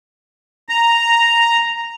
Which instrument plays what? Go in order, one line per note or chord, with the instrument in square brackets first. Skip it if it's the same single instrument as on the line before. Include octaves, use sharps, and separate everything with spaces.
[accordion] A#5